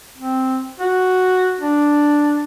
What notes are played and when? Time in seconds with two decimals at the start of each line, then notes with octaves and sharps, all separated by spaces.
0.17 C4
0.80 F#4
1.60 D4